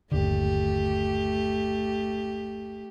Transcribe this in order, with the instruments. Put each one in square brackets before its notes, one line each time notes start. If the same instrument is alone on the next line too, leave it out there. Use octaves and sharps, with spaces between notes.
[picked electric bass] G1 D#2 D3 [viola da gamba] A3 G4